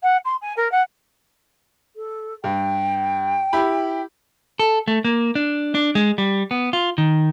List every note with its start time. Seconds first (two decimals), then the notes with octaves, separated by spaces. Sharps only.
0.03 F#5
0.25 C6
0.41 G#5
0.56 A#4
0.71 F#5
1.96 A4
2.44 G2 G5
3.53 E4 G4 B5
4.59 A4
4.88 A3
5.05 A#3
5.35 D4
5.75 D4
5.95 G#3
6.18 G3
6.51 B3
6.73 F4
6.98 D#3